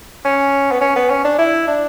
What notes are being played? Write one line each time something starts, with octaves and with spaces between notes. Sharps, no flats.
C#4
B3
C#4
B3
C#4
D4
E4
D4